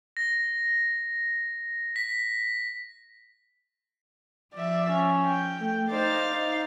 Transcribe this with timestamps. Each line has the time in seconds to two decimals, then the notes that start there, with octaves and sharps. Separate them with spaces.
0.17 A#6
1.96 B6
4.54 F3 D5 E5
4.90 C#4
5.27 G5
5.59 A3
5.90 D#4 C5 D5 F5 A6
6.33 D#4